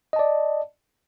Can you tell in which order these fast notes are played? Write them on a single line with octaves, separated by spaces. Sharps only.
D#5 A5 D5